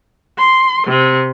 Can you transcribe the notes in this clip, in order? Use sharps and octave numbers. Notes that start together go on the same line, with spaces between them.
C6
C3